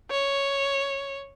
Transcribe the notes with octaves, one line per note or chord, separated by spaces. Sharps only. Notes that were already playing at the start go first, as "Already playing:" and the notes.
C#5